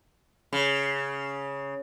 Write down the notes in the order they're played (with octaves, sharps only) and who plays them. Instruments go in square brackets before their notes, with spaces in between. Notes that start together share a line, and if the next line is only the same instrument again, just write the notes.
[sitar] C#3